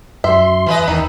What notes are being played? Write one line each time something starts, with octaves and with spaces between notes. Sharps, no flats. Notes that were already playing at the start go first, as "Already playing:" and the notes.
F#2 E5 C6
E3 B4 D#5
E2 D#3 D#4